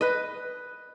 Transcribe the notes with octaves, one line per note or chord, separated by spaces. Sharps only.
B4 D#5